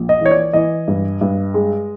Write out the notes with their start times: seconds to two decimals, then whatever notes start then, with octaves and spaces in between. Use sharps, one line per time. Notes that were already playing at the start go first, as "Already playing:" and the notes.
Already playing: A#1
0.09 D#5
0.21 E3 C#5
0.31 D5
0.53 E3 D#5
0.88 G2
1.21 G2
1.54 G#3